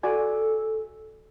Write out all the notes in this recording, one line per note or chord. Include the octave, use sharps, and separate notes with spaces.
F#4 A4 D5 G#5